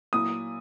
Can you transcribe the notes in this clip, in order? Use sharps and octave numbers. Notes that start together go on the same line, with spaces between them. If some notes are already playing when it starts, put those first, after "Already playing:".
A#2 F#3 A#3 E4 D#6